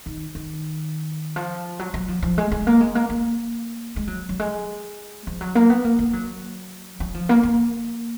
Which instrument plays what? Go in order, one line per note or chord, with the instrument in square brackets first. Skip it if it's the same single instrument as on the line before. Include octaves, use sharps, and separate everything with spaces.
[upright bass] D#3
D#3
F3
F#3
F#3
F3
F3
G#3
G#3
A#3
G#3
A#3
A#3
G#3
F#3
F#3
G#3
F3
F#3
A#3
B3
A#3
A#3
F#3
F#3
F3
A#3
A#3